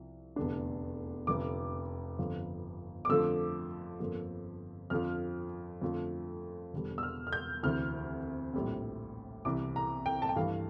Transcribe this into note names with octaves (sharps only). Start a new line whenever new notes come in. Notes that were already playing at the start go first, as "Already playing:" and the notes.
Already playing: C2 F3
F1 E2 D3 A3 D4
F1 F2 D3 D6
G1 F2 D3 F3
D6
F2 D3 F3 A3 E6
G1 F2 D3 F3 A#3
F2 D3 F3 F6
F2 D3 F3 A3
E1 E2 D3 G3
E6
F6
F6
G6
D2 C3 E3 F6
A#1 A2 G3 C4
C2 C3 E3 D6
A#5
G5
A5
G5
G2 E3 A3 F5